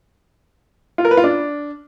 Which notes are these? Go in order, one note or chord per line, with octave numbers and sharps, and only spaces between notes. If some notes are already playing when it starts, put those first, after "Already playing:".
F4
A#4
B4
F4
D4